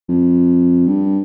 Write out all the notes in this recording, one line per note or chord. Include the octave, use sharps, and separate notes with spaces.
F2
G2